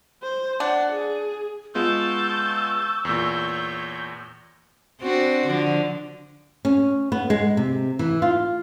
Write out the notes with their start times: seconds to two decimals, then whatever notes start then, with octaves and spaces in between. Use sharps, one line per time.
0.23 C5
0.60 D4 F#5
0.93 G#4
1.75 G#3 B3 F4 A5 C#6 E6 G6
3.05 E2 A#2 C#5 G6
5.01 C4 D4 F#4
5.47 D3 F3
6.65 C#4
7.12 B3
7.30 G#3
7.57 C3
7.99 E3
8.22 F4